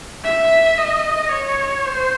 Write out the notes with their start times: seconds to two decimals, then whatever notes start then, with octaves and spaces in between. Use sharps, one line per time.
0.24 E5
0.78 D#5
1.31 C#5
1.86 C5